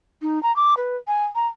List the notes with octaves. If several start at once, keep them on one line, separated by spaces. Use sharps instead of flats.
D#4
A#5
D6
B4
G#5
A#5